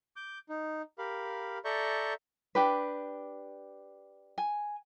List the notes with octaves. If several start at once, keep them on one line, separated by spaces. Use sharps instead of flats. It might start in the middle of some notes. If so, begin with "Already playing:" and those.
D6 G6
D#4
G4 A#4 F5 B5
A4 D5 E5 A#5 C#6 G6
D4 G4 B4
G#5